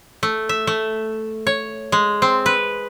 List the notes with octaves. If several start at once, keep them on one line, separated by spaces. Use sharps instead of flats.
A3
E5
A3
C#5
G#3
C4
B4